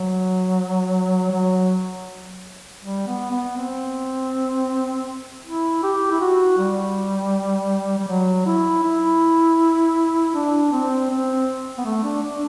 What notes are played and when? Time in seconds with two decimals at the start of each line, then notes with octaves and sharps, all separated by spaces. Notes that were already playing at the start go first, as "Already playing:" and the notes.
Already playing: F#3
1.31 F#3
2.82 G3
3.07 B3
3.31 B3
3.57 C4
5.45 E4
5.83 G4
6.11 E4
6.21 F#4
6.58 G3
7.98 G3
8.08 F#3
8.46 E4
8.84 E4
10.34 D4
10.72 C4
11.10 C4
11.78 B3
11.85 A3
12.03 D4
12.22 D4